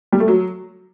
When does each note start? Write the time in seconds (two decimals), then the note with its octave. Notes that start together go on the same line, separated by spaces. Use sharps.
0.12 G3
0.20 A3
0.28 F#3